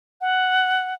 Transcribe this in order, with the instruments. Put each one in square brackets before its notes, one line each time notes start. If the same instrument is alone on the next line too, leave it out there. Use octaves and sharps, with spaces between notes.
[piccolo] F#5